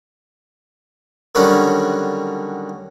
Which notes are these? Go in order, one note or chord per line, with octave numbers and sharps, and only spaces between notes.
D3 D#3 F#3 G3 C#4 D4